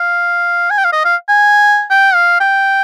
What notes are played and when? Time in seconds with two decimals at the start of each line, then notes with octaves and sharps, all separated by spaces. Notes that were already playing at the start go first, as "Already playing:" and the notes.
Already playing: F5
0.70 G#5
0.78 G5
0.84 F5
0.92 D#5
1.05 F5
1.28 G#5
1.90 G5
2.14 F5
2.40 G5